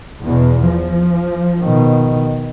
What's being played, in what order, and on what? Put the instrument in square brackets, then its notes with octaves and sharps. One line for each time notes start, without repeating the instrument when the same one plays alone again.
[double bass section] E2 B2
F3
[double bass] B2 D#3